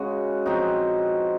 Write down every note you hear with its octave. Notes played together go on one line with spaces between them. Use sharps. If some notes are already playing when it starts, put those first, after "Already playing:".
Already playing: C#3 G#3 F#4
F3 C4 D#4 F#4